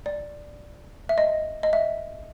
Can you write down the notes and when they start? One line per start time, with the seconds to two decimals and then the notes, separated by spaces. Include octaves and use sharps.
0.06 D5
1.09 E5
1.18 D#5
1.63 D#5
1.73 E5